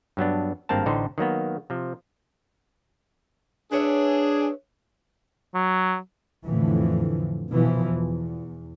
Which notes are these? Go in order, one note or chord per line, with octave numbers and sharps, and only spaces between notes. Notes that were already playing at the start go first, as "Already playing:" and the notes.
G2 F#3 B3 D4
G#1 G2 A#3 C4 A#4 A5
A1 A2 D3 D#4 C5
D#3 F#3 A#3 B3
C3 F3
D4 G#4 B4 C#5 E5
F#3
F2 A2 D3 E3 F3
B2 E3 F3
E2